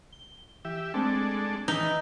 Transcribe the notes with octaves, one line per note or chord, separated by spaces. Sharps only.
G7
E3 G4 E5
G#3 A3 C4 D4 A4 G5
D#3 E3 D#4 B4